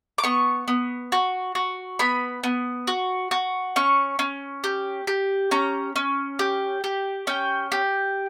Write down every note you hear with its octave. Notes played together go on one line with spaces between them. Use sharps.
D6
B3 C#6
B3
F#4
F#4
B3 B5
B3
F#4
F#4
C#4 C#6
C#4
G4
G4
C#4 A#5
C#4
G4
G4
C#4 G5
G4